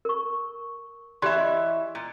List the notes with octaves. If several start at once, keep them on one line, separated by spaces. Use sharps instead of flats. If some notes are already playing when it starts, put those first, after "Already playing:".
A#4 C#6
E3 G4 D5 E5 C6
D#5
A#2